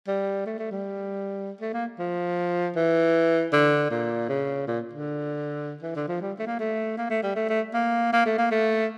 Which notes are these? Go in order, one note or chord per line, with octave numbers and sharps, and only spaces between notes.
G3
A3
A3
G3
A3
A#3
F3
E3
D3
A#2
C#3
A#2
D3
E3
D3
F3
G3
A3
A#3
A3
A#3
A3
G3
A3
A3
A#3
A#3
A3
A#3
A3